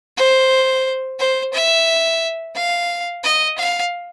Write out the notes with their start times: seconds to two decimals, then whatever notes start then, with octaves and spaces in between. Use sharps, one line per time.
0.17 C5
1.19 C5
1.53 E5
2.55 F5
3.24 D#5
3.58 F5